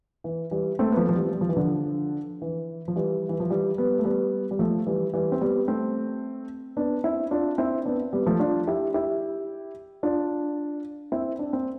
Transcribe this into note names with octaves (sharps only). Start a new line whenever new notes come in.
E3
E3 G3
A3 C4
B3
F3 A3
F3
E3 G3
G3
F3
E3
D3 F3
E3
F3
E3 G3
E3
F3
E3 G3
G3 B3
A3
G3 B3
G3
F3 A3
E3 G3
E3 G3
C4
G3 B3
A3 C4
B3 D4
C4 E4
D4 F4
C4 E4
B3 D4
G3 B3
F3 A3
D4 F4
E4 G4
E4 G4
D4 F4
C4 E4
D4
C4